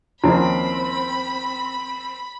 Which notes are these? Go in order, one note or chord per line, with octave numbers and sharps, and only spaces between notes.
D#2 F3 C4 C#4 E4 B5